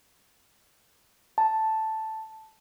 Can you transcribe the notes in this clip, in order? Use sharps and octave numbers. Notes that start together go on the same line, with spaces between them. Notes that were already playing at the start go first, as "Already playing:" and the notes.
A5